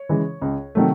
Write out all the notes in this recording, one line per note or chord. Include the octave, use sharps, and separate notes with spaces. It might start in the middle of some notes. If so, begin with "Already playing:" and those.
Already playing: C#5
C#3 E3 G#3
C#2
C3 D#3 F#3 A3